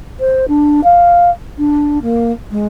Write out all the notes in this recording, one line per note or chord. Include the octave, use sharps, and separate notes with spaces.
C5
D4
F5
D4
A#3
G#3